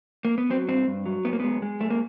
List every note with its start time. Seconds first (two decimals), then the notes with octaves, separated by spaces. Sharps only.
0.25 A#3
0.38 B3
0.49 F#3 C4
0.68 G2 C4
0.88 G2
1.06 F#3
1.25 F#2 B3
1.33 A#3
1.40 G#3 B3
1.62 G#3
1.80 F#2 A3
1.90 A#3